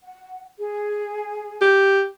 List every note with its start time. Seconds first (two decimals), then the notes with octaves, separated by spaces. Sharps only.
0.03 F#5
0.59 G#4
1.61 G4